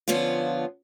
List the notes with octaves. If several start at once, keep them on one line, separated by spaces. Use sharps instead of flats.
D3 F3 B3 C#4 F4